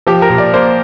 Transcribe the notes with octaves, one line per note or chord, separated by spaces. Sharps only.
F3 G4
A#4
A#2
D5
A#3 C5